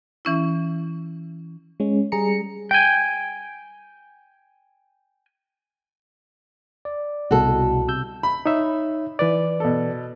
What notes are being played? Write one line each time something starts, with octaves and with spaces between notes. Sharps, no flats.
E3 C#4 E4
G#3 C#4
G3 G#4 A#5 C#7
G5 G#5
D5
C2 B2 F#4 A4
C3 E6 G6
B5
D#4 C#5 E5
E3 B4 D5
B2 A4